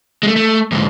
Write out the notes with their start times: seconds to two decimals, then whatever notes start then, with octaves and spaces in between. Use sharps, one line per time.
0.23 G#3 A3
0.36 A3
0.72 D2 G#2